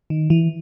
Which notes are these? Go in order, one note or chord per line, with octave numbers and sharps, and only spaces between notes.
D#3
E3